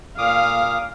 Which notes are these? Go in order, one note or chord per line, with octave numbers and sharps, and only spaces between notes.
A#2 F5 D6 D#6